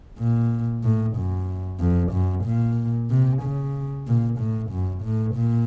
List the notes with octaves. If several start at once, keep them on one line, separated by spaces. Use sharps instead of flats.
A#2
A2
F#2
F2
F#2
A#2
C3
C#3
A#2
A2
F#2
A2
A#2